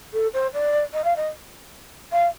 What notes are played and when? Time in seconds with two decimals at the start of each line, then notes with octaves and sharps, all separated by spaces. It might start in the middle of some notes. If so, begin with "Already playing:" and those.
0.13 A4
0.33 C5
0.53 D5
0.93 D#5
1.04 F5
1.16 D#5
2.12 F5